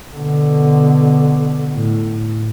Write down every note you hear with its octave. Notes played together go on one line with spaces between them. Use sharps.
B2 D3
A2